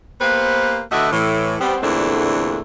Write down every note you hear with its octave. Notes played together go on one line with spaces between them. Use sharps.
A#3 B3 G4 B4 C5
D3 A3 F#4 B4 D#5 E5
A2 E3
G3 B3 C4
E2 A#2 D3 A3 C4 D4